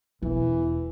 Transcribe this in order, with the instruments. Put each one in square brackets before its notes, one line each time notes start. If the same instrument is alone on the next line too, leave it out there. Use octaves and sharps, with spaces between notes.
[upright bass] E1 [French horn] E3